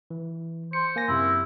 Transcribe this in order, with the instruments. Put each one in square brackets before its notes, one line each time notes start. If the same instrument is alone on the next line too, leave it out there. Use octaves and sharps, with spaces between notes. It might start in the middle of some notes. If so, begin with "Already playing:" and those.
[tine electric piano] E3
[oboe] C5 [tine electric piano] C#7
[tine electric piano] A#3 G#5 A#6
[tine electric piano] F#2 C3 [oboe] E4